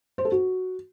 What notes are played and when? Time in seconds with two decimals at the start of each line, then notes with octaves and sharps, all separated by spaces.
0.18 C5
0.25 A4
0.32 F#4